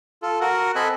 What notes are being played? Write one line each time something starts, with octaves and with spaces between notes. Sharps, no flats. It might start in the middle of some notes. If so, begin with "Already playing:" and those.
F4 A4
F#4 A#4 F#5
C4 A4 D#5 G#5 B5 F#6